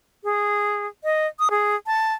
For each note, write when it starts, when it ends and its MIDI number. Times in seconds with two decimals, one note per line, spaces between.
0.24 0.87 68
1.04 1.27 75
1.39 1.49 87
1.51 1.76 68
1.86 2.14 81